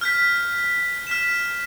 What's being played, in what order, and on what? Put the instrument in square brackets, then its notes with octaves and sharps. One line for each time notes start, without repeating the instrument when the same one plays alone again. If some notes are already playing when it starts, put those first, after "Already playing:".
[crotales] F6 G6 B6
F6 B6 E7